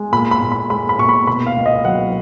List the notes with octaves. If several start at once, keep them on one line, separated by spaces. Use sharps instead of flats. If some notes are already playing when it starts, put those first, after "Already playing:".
Already playing: G#3
A#2 B5
B5
A#2
B5
G#3 B5
B5
A#2 C#6
B5
B2 B5
F5
C#2
D#5
F#3 F#5